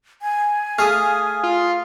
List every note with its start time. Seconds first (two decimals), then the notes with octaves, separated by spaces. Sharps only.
0.22 G#5
0.79 A3 G#4 F5 D#6
1.43 F4